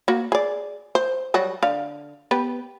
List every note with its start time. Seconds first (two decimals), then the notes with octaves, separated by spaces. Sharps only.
0.08 A#3 F#4
0.32 G#4 D5
0.95 C5
1.34 F#3 G3 F#4
1.63 D3 F5
2.31 B3 G4 B4